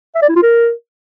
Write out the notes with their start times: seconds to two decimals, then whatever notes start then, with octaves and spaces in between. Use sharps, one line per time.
0.15 E5
0.22 D5
0.29 E4
0.36 F4
0.43 A#4